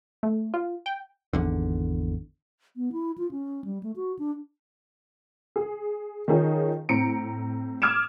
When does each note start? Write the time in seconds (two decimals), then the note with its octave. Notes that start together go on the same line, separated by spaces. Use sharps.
0.23 A3
0.54 F4
0.86 G5
1.33 G#1 E2 D3
2.76 B3
2.92 E4
3.18 F4
3.31 C#4
3.65 G3
3.83 A3
3.96 F#4
4.19 D4
5.56 G#4
6.28 D#3 F3 C#4 D#4 G#4
6.89 A2 C4 A#5 C#7 D7
7.82 D6 D#6 F6 G#6 D7 E7